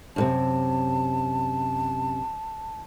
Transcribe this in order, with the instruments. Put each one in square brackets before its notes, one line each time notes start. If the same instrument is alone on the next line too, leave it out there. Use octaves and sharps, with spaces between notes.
[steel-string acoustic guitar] F#2 A2 C3 [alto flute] A5